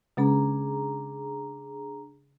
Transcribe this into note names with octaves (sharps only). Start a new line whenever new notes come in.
C#3 G#3 C#4 D4 G#4 A#5